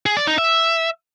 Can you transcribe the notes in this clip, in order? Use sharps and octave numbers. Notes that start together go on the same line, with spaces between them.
G#4
D5
D#4
E5